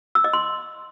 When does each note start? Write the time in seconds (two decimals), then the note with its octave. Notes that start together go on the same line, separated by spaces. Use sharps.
0.15 E6
0.24 D#5
0.33 C6